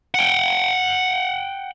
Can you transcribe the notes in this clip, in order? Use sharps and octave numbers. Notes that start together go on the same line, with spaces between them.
F#5 G5